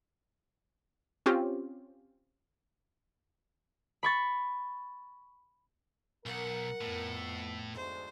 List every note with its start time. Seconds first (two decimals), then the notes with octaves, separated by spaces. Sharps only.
1.26 C4 C#4 F4 G4
4.03 B5 C#6 A6
6.26 B1 A#4 F#5
6.81 F2 A2 B3
7.74 D2 G#2 C5